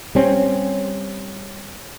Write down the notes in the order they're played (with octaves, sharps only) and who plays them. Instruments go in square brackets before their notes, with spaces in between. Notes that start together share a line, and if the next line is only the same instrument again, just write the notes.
[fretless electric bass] G3 C4 C#4